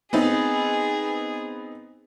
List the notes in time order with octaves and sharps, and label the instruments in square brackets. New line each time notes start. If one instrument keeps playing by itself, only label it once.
[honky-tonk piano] B3 C4 D#4 [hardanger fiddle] G#4